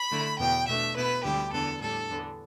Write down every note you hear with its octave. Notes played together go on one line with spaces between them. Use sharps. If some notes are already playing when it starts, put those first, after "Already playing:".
Already playing: B5
D3 A3 E4
E2 B2 B3 G5
B2 A3 D4 E5
B2 B3 E4 B4
D2 D3 G3 E4 G4
E2 D3 B3 D4 A4
A2 G3 D4 A4
E2 D3 B3 D4